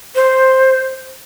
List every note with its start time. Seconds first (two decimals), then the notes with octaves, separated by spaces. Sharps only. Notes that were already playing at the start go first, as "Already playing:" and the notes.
0.15 C5